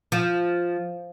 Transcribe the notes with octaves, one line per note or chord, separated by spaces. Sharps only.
F3